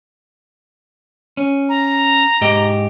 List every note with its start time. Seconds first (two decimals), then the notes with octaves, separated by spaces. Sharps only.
1.37 C#4
1.69 A#5
2.41 G#2 G4 D#5